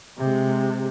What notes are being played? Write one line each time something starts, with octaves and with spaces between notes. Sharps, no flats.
C3 G#3